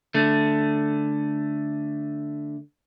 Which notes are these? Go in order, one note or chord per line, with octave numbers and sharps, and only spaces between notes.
D3 A3